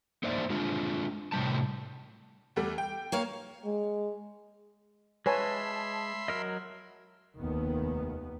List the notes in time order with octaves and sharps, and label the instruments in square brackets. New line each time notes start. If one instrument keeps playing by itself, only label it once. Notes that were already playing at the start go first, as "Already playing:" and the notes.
[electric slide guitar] A#3 D#4 C5 D5 E5
G#3 D4 F4
A2 C3 F3 G3 A5
[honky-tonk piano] E2 G3 A3
G5
[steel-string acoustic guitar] A#3 C#5 F5
[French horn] G#3
[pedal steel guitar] G#3 A5 [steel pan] B4 C#5 G#5 [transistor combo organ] E5 B5 C6
[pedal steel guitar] F#3 A#4 D#5
[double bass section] F1 D#2 D#3 B3